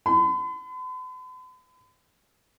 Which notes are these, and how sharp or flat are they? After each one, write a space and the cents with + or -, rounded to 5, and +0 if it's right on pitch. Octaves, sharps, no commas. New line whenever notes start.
B5 +45